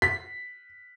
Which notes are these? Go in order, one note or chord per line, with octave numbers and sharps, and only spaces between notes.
B6